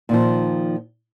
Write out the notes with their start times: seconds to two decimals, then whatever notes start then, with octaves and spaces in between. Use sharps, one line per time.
0.09 A#2 D#3 F3